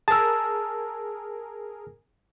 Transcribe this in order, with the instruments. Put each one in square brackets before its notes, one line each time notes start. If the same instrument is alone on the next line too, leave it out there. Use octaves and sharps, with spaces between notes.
[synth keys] G#4 A#4 [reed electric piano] A5 E6